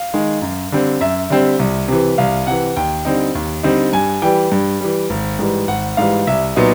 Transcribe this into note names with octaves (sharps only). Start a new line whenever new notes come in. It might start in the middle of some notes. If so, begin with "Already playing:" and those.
Already playing: F5
D#3 G#3
F#2
D3 G3 C4
F#2 E5
D3 G3 C4
C2
C3 E3
C2 F5
C3 E3 F#5
D#2 G5
D3 G3 C4 D#4
D#2
D3 G3 C4 D#4
G2 G#5
E3 G3 G5
G2
E3 G3
G#1
G#2 E3 G3
G#1 F#5
G#2 E3 G3 F5
C2 E5
A#2 F#3 B3 D#4